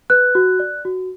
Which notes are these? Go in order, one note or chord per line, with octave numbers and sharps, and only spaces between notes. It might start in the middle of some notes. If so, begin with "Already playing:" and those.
B4 F#6
F#4
D5
F#4